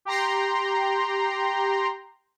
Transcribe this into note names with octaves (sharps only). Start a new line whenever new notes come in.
G4 G5 A#5 C6